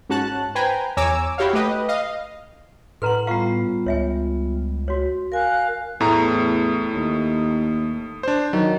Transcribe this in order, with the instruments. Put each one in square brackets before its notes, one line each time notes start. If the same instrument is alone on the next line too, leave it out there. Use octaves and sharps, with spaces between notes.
[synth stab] G#2 C#4 F#4 A5 F#6
B4 C5 G5 G#5 A#5
E2 C#5 G#5 A#5 D6 E6
E4 F#4 G4 C#5 F5
A3 G4 B4 D#5
D#5 F5
[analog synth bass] A2 [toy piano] A4 B4 A#5 [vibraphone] F#5 C6
[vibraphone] G3 B3 F4 [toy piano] F5 A#5 C#6
[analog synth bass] C#2 [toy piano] C#5 E5 G#5
[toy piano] F#4 C#5
[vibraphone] A#4 G#5 [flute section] F5 F#6
[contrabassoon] E2 [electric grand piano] A2 A3 A#5
[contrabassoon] D#2
[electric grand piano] D4 C5
[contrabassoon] D#3 [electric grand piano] F#3